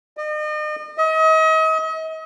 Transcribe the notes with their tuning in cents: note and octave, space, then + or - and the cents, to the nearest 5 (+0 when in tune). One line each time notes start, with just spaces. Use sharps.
D#5 -40
D#5 +40